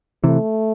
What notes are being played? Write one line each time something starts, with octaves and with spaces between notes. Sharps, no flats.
C3 E3 A3